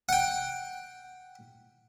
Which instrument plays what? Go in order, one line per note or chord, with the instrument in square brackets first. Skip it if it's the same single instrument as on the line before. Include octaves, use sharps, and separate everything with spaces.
[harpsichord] F#5 G5